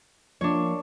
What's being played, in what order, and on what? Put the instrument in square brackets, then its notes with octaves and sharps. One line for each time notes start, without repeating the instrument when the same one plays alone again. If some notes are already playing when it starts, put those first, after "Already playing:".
[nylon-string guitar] F3 A#3 [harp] D4 C#5